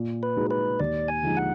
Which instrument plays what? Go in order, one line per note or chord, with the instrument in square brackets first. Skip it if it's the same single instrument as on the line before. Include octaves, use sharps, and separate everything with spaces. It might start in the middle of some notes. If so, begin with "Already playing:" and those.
Already playing: [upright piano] A#2
[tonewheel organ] B4
[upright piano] G#3 D#4 F#4
[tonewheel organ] B4
[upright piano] D#2 [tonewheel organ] D5
[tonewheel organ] G#5
[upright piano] D3 F3 G#3 D#4
[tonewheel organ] F#5